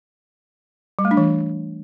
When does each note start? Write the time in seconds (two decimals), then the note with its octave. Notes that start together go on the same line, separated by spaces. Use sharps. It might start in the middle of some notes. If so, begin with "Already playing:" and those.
0.99 G3
1.05 A3
1.11 D4
1.17 E3